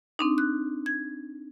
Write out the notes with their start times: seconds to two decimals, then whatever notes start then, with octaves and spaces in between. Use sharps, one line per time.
0.19 C4 D4 D#4
0.38 F#6
0.86 G#6